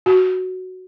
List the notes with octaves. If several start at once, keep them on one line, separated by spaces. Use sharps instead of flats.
F#4